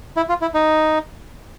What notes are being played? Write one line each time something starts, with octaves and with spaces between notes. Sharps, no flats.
E4
F4
E4
D#4